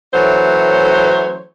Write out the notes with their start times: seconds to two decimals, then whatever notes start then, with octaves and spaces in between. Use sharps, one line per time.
0.12 E3 F#3 A3 C#4 C5 C#5